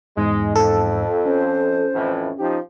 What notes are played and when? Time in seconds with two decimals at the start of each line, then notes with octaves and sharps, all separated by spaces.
0.17 E2 G#2 G#3
0.56 F2 A4
1.26 C#4 C5
1.95 F2 A2 E3
2.39 F3 D#4 G4